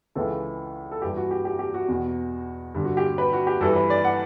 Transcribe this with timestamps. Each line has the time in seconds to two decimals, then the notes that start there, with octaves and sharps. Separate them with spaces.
0.15 C#2 C#3 E3 A4
0.91 A4
1.02 G2 E3 G4
1.17 F#4
1.31 G4
1.45 G4
1.59 G4
1.74 F#4
1.88 E2 B2
2.75 G2 D3
2.85 F#4
2.97 G4
3.18 B4
3.33 F#4
3.47 G4
3.61 G2 E3 A4
3.76 B4
3.90 D5
4.05 F#5